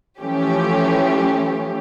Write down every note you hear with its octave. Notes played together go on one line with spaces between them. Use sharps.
E3 F3 A3 C#4 G4